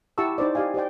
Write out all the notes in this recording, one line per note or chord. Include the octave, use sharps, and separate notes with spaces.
E4 G4 F#5 A5 C#6 E6
D#4 C5 D5
G4 D5 D#5 F5 G#5
G4 C5 D5 G5